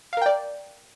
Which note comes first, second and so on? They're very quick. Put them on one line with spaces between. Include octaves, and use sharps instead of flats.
F5 A#4 G5 D5